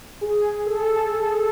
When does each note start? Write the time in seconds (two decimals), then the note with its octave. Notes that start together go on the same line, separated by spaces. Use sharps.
0.21 G#4
0.66 A4